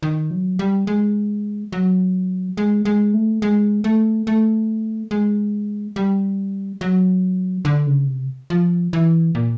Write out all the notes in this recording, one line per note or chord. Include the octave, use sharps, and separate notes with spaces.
D#3
F#3
G3
G#3
F#3
G#3
G#3
A3
G#3
A3
A3
G#3
G3
F#3
D3
C#3
C3
F3
E3
A#2